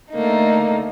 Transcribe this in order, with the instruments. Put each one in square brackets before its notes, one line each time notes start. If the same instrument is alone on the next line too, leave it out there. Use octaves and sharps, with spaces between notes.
[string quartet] D3 A3 A#3 D#4